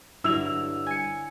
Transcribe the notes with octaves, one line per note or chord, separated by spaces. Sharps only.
G2 D3 F#3 E4 E6 F7
G#5 C#7